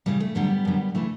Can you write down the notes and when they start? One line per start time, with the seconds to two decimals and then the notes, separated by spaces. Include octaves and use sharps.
0.06 E2 C#3 E3 G3
0.20 A3
0.35 D2 D3 F#3 G3 B3
0.65 F#2 D3 F#3
0.95 C#3 E3 A3